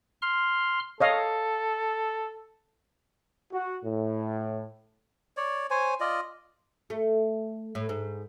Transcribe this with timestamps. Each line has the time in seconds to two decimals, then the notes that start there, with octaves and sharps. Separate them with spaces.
0.22 C6 F6
1.00 A4 C#5 D#5 F5
3.52 F#4
3.83 A2
5.37 C#5 D5
5.70 C5 C#5 G#5
6.00 F4 D5 D#5
6.90 A3
7.75 A2
7.89 G#2